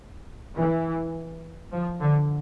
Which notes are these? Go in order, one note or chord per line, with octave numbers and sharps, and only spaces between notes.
E3
F3
D3